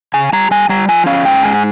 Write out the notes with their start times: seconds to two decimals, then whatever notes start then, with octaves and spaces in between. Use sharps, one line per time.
0.14 C#3 G#5
0.33 G3 A#5
0.51 G3 G#5
0.69 G3 A#5
0.88 F3 G#5
1.06 C#4 F5
1.24 G#2 G5
1.43 G#3 G#5